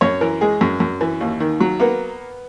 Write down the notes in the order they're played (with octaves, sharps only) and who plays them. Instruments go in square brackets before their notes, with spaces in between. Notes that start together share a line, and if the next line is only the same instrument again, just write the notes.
[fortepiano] F#2 C#5
E3 A#4
G#3 G#4
F#2
F#2
E3
D#2
D#3
F#3
A#3 B3